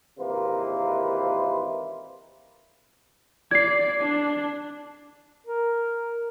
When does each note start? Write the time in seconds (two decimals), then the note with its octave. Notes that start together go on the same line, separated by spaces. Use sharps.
0.19 G#1 C3 E3 A#3 B4 C5
3.51 D5 G#6 C7
4.01 D4
5.47 A#4